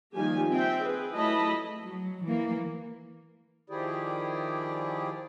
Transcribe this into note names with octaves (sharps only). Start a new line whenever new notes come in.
D#3 F3 G3 A#3 G4 G#5
C4 E5 G5
G#4 B4
F#3 A3 E4 D#5 A5 B5
F#3
E3 A#3
D#3 F3 E4 G4 G#4 D5